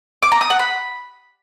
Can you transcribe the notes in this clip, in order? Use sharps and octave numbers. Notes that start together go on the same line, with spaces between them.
D6
A#5
D#6
F#5
B5